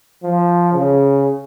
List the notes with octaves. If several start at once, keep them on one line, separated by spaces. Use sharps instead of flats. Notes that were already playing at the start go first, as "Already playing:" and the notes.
F3
C#3